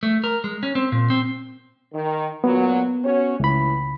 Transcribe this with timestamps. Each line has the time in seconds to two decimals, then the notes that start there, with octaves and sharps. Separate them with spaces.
0.03 A3
0.24 A#4
0.44 G#3
0.63 C#4
0.75 C4
0.92 A#2
1.10 C4
1.93 D#3
2.44 A#2 F#3 B3
3.04 C#4 F#4 C#5
3.40 C#2 A2 E3 B5